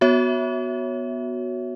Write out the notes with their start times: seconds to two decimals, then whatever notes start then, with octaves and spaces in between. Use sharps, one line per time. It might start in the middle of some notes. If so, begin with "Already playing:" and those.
0.01 B3 F#4 C#5 E5